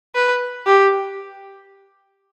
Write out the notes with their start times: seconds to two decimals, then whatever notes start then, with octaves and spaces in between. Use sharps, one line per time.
0.15 B4
0.66 G4